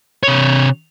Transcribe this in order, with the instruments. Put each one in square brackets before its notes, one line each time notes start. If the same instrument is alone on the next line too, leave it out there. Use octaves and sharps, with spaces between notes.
[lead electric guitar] C3 C#5